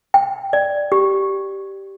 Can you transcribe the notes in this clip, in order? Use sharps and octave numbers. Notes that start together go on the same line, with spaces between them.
G5
D5
G4